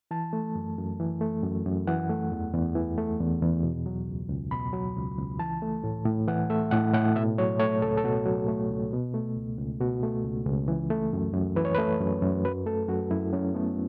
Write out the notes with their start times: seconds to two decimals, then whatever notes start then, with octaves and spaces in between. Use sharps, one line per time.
0.11 E3 A5
0.33 A3
0.55 F#2
0.78 F#2
1.00 E3
1.21 A3
1.43 F#2
1.66 F#2
1.87 E3 F#5
2.09 A3
2.32 E2
2.54 E2
2.75 E3
2.98 A3
3.20 E2
3.42 E2
3.63 B2
3.86 F#3
4.07 C#2
4.29 C#2
4.51 B2 B5
4.73 F#3
4.96 C#2
5.18 C#2
5.39 E3 A5
5.62 A3
5.84 A2
6.06 A2
6.28 E3 F#5
6.50 A3 E5
6.71 A2 F#5
6.94 A2 F#5
7.16 B2 E5
7.38 F#3 C#5
7.60 A3 C#5
7.82 C#2 A4
7.97 A4
8.04 B2 F#4
8.26 F#3
8.48 A3
8.71 C#2
8.93 B2
9.14 A3
9.36 C#2
9.58 C#2
9.80 B2 F#4
10.03 A3
10.24 C#2
10.46 C#2
10.68 E3
10.90 A3
11.13 F#2
11.34 F#2
11.56 E3 B4
11.65 C#5
11.75 A3 B4
12.01 F#2
12.22 F#2
12.45 F#3 B4
12.66 A3 A4
12.89 F#2 F#4
13.11 F#2 E4
13.33 F#3 C#4
13.54 A3 B3